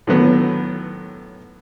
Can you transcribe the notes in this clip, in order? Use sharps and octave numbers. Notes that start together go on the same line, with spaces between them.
A2 D3 D#3 F#3 B3